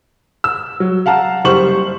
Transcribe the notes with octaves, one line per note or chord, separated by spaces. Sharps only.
E6
F#3
F5 F#5 A5 A#5 F6
F#1 G3 C5 C6 C#6 F#7